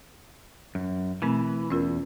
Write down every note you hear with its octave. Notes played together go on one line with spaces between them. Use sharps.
F#2
B2 E3 A3 C4
E2 C#4 F4 A#4